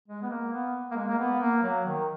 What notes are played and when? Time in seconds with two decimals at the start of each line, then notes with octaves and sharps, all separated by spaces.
0.08 G#3
0.22 B3
0.30 A#3
0.52 B3
0.91 A#3
0.96 G#3
1.08 A#3
1.19 B3
1.40 A#3
1.63 F#3
1.85 D#3